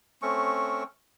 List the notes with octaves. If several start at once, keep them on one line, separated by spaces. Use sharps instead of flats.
A3 C4 C#4 C#6